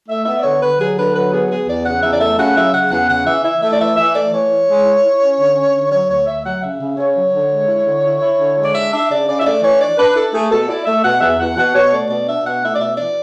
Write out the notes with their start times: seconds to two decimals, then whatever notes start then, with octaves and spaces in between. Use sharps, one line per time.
0.08 A3 E5
0.26 B3 E5
0.39 D5
0.43 D3 C#5
0.61 D3 B4
0.80 F#3 G#4
0.97 D3 B4
1.14 F#3 B4
1.32 B3 G#4
1.50 B3 G#4
1.68 E2 D5
1.85 C#3 F#5
2.02 E2 E5
2.12 D5
2.20 A3 E5
2.38 C#3 F#5
2.56 F#3 E5
2.74 C#3 F#5
2.91 E2 F#5
3.09 C#3 F#5
3.26 E3 E5
3.44 E4 E5
3.62 A3 E5
3.71 D5
3.80 E3 E5
3.97 E3 E5
4.14 A3 D5
4.32 E3 C#5
4.51 E4
4.68 G#3
4.86 E4
5.04 E4
5.21 C#4
5.39 D3
5.56 C#4
5.74 D3
5.91 F#3 C#5
6.09 D2 C#5
6.26 D2 E5
6.45 F#3 F#5
6.62 C#3 E5
6.80 C#3
6.97 C#3 C#5
7.16 F#3
7.33 D3
7.50 G#3
7.68 E4
7.86 D3
8.04 E4
8.21 E4
8.39 D3
8.57 G#3
8.65 D5
8.75 D4 E5
8.92 D4 E5
9.10 C#3 D5
9.27 C#3 D5
9.39 E5
9.45 A3 D5
9.62 E3 C#5
9.80 D4 D5
9.98 D4 B4
10.15 E4 A4
10.34 A3 G#4
10.51 B2 A4
10.68 E4 D5
10.86 A3 E5
11.03 B2 F#5
11.21 E2 E5
11.39 E2 F#5
11.57 B2 F#5
11.74 B2 C#5
11.92 A3 D5
12.09 B2 D5
12.27 D4 E5
12.45 B2 F#5
12.62 A3 E5
12.74 D5
12.80 B2 E5
12.98 E3 D5